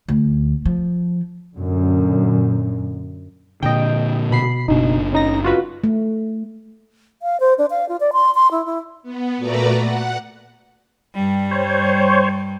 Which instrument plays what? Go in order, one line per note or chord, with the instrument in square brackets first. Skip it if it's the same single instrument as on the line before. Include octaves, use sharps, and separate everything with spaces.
[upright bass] D2
F3
[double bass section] F#2 A#2 D3
[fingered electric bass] A#2 D3 [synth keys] D#5 G5
[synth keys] B2 B5 C7
[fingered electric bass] F#1 D4 [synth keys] B2 D#4
[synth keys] C#3 D#4 A#6
F4 F#4 B4
[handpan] A3
[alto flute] F5
C5
D4
F5
F4
D5
C6
C6
E4
E4
[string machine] B3
A#2 A3 F#4 B4 D5 A#5
F#5
[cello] G2 G3
[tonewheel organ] C5 C#5